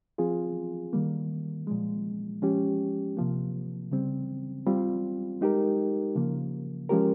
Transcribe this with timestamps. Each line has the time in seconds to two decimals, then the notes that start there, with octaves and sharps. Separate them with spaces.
0.18 F3 C4 F4 G#4
0.93 D#3 G3 A#3
1.67 A#2 F3 G#3
2.42 F3 G#3 C#4 G4
3.17 C3 F3 A#3
3.92 C#3 G3 C4
4.67 G3 C4 F4
5.41 G#3 D#4 G4 A#4
6.15 C#3 F3 A#3
6.89 F3 G#3 C#4 G4 A#4